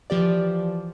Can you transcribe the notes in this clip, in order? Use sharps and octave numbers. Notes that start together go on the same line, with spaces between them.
E3 F3 G4 D5